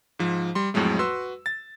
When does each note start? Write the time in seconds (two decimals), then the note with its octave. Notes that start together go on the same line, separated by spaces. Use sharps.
0.19 G#2 F3
0.55 G3 C6
0.74 F2 A2 F#3 G#3 A3
0.99 F#4 B4 C6 E6
1.46 A6